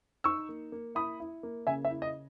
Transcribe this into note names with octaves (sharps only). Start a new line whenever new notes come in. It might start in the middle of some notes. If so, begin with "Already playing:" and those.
D#4 C#6 E6
A#3
A#3
E4 B5 D#6
E4
A#3
C#3 E5 G#5
E5
E4
D#5